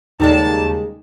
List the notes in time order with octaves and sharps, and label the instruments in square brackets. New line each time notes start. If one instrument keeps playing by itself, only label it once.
[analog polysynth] D#2 [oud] C#3 G3 G#3 [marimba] D#4 A4 D5 [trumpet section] A5